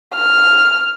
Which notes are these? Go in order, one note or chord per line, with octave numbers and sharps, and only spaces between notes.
F6